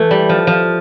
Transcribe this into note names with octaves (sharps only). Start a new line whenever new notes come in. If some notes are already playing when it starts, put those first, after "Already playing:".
Already playing: E3 A3
G3
F3
F3